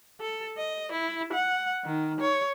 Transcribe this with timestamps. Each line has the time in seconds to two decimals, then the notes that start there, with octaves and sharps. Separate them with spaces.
0.21 A4
0.58 D#5
0.92 E4
1.33 F#5
1.85 D#3
2.21 C#5